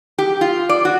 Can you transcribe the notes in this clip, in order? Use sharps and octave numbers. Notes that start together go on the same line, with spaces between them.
G4
F4
D5
F#4